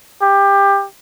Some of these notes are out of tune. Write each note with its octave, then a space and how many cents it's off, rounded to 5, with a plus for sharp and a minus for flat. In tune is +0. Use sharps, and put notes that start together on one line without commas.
G4 +20